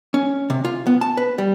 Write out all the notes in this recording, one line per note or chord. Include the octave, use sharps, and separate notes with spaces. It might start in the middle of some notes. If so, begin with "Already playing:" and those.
C#4
C3
F4
B3
A5
B4
G3